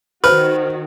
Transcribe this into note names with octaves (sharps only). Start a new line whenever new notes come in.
D#3 F#4 B4 C5 F6